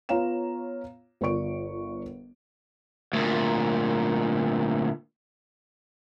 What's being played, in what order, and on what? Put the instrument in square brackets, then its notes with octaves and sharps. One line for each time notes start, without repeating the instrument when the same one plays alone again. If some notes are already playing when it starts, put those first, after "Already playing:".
[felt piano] B3 F4 C#5 F5 A#5 E7
G1 F4 A#4 D5 C#6 D7
[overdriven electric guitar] D2 A#2